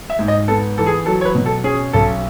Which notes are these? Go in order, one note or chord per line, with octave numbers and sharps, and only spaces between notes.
E5
G#2
D#5
B3 A4
E3 A4
G#4
F#3 A4
C#5
B4
B2
A4
C#4 G#4
B1 A4